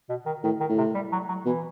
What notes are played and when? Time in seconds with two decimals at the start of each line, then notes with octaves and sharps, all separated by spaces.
0.09 B2
0.26 D#3
0.43 A2 D#3
0.60 D#3
0.69 A2
0.78 C3
0.94 G3
1.12 F#3
1.28 F#3
1.45 B2 E3